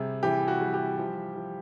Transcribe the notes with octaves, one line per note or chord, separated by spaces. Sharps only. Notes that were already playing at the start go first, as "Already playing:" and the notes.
Already playing: C3 G3 G#4
E3 G4
F#4
G3
G4
F3
F3